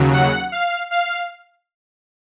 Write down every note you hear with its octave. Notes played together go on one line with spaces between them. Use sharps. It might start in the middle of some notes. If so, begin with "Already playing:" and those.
Already playing: D#2 C#3 F#3
F#5
F5
F5